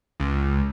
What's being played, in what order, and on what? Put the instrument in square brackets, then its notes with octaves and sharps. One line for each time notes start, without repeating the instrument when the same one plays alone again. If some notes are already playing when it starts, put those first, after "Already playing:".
[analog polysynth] C#2